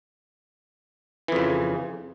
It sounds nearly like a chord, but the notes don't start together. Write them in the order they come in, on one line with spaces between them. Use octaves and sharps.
E3 F2 C#3